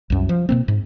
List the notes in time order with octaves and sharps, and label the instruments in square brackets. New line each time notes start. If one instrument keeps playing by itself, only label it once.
[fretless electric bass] C2 F#2
F3
B2 A#3 C4
G#2